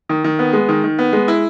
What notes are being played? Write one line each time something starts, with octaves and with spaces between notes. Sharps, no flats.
D#3
D#3
B3
G#3
D#3
D#3
B3
G#3
E4